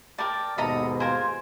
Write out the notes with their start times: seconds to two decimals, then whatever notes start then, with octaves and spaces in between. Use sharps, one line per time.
0.18 A#4 D5 G5 A5
0.58 D#2 G#2 B2 A4 D#5 A#5 D#6
1.00 F4 A#4 C5 G#5